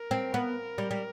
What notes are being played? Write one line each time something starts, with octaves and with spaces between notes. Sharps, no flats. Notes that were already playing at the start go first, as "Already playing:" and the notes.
Already playing: A#4
C4
B3
G3
G3